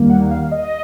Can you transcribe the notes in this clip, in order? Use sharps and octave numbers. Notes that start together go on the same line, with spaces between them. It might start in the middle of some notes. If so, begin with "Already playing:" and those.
Already playing: D#2 D#3 G3 A#3
F#5
F5
D#5